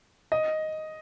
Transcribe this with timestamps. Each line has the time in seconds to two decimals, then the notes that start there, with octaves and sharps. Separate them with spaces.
0.32 D#5